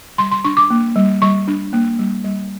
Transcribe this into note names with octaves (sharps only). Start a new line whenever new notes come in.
G3 C6
C6
D4 C#6
D6
A#3
G3
G3 C#6
D4
A#3
G3
G3